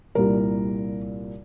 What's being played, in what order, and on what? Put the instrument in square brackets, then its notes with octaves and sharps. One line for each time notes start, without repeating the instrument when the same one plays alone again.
[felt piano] C2 A#2 G3 A#4